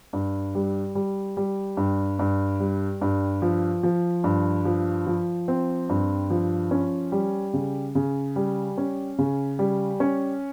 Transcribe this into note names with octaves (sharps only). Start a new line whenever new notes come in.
G2
G3
G3
G3
G2
G2
G3
G2
F3
F3
G2
F3
F3
C4
G2
F3
C#4
G3
C#3
C#3
G3
C#4
C#3
G3
C#4